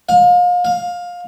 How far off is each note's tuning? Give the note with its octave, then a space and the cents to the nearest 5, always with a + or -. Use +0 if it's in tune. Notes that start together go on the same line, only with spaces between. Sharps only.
F5 +35
F5 +20